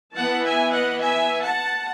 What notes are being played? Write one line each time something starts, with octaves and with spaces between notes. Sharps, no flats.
E3 B3 F#5 A5
E5 G#5
D#5 F#5
E5 G#5
F#5 A5